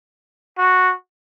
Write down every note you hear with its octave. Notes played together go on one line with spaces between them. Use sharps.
F#4